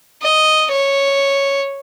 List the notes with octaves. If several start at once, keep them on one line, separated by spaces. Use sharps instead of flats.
D#5
C#5